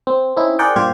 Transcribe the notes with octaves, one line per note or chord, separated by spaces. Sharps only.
C4
C4 C#4 D#4 E4
G#4 A#4 C5 D5 F#5 G5
G2 A#2 G4 C5 F5 G#6